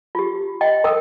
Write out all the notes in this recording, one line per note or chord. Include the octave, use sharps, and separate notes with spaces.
F4 G4
D#5 G5
A#4 G5 D#6